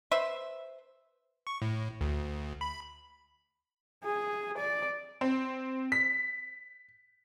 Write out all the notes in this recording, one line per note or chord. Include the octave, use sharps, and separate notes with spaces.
B4 C5 E5
C#6
A2
D2
B5
G#4
D5
C4
B6